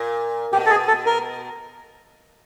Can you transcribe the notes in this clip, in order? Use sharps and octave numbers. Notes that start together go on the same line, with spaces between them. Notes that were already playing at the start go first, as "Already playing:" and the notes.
Already playing: A#2
B2 G4
A4
G#4
A4
A#4